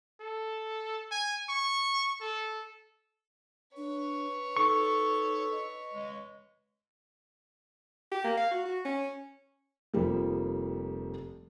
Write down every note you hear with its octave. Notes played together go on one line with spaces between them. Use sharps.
A4
G#5
C#6
A4
D4 B4 C#5
D#4 A4 C#6
D#5
G#3
G4
A#3
F5
F#4
F#4
C#4
F1 F3 G3 A#3